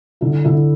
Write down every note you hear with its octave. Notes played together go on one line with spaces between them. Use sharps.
D3 E4
D3 E4